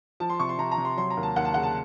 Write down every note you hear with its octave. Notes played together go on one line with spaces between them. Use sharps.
F3 A5
C6
C3 C#6
C6
C3 A#5
A#5
C3
C6
F#3 C6
A#5
D#2
A5
D#2 F#5
A5
C#3 F#5
A5